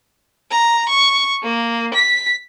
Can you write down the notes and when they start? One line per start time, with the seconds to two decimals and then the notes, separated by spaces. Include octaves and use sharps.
0.51 A#5
0.89 C#6
1.43 A#3
1.94 B6